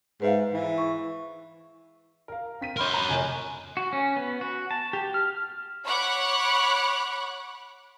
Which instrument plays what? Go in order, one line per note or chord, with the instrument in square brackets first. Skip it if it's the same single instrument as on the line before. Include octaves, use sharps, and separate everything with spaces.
[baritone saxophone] G#2 [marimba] B4 E5 F5
[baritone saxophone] E3
[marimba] C#6
[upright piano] A#4 F5
C4 B6 D#7
[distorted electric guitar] A#4 C#5 [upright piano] B5 C6 F6
[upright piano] A#5
F1 G#5
[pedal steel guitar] F#4
C#4
B3
F#4
A5
G4
F6
[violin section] C#5 F#5 B5 C#6 D6 F#6